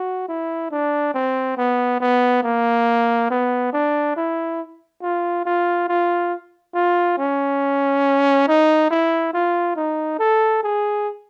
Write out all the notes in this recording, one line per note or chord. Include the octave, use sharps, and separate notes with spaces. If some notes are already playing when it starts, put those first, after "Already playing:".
Already playing: F#4
E4
D4
C4
B3
B3
A#3
B3
D4
E4
F4
F4
F4
F4
C#4
D#4
E4
F4
D#4
A4
G#4